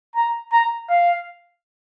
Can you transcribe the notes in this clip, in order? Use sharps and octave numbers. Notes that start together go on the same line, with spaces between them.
A#5
A#5
F5